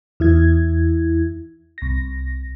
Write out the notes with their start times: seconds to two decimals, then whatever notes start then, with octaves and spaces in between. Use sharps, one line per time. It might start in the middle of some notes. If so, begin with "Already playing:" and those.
0.20 E2 E4 G#6
1.78 C2 A#6